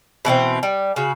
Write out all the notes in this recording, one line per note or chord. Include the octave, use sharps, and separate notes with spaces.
B2 E3 A3 C4
G3
C#3 F#4